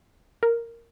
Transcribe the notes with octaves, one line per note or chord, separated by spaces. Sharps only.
A#4